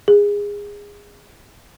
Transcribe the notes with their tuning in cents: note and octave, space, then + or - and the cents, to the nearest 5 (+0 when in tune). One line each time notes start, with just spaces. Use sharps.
G#4 -20